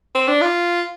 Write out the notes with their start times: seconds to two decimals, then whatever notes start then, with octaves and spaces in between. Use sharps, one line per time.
0.15 C4
0.28 D4
0.42 F4